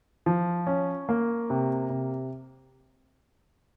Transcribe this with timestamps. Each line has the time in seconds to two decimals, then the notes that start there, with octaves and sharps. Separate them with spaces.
0.26 F3
0.67 C#4
1.09 A#3
1.50 C3
1.90 C3